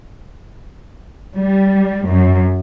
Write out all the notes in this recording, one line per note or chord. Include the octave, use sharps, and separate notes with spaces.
G3
F#2